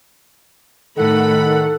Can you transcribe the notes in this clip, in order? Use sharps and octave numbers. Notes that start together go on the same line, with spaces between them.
A2 D#3 A4 F#5 B5